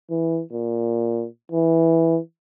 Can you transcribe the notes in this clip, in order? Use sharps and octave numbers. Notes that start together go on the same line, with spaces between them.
E3
A#2
E3